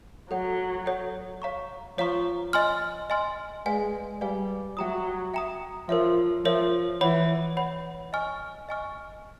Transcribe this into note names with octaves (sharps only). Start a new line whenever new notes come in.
F#3 A4 C#5 F#5
A4 C#5 F#5
C#5 F5 A#5 C#6
F3 C#5 F5 A#5 C#6
D#5 G#5 C6 F6
D#5 G#5 C6 F6
G#3 B4 D5 F5 G#5
G3 B4 D5 F5 G#5
F#3 E5 G5 A#5 D#6
E5 G5 A#5 D#6
F3 A#4 C#5 E5
F3 A#4 C#5 E5
E3 C#5 F#5 B5
C#5 F#5 B5
D#5 G#5 C#6 F6
D#5 G#5 C#6 F6